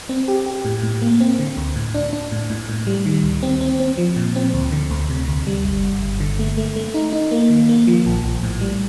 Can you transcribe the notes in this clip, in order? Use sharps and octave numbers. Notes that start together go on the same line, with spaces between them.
C4
G4
G4
A2
A2
A#3
C4
D3
D2
A2
D4
D4
A2
A2
A2
G3
D#3
D2
C4
C4
C4
F3
A#2
C4
D2
D3
D2
C3
D2
G3
G1
G1
G1
D3
A3
A3
A3
D#4
D#4
A#3
D#3
A#3
F3
A#1
A#1
A2
G3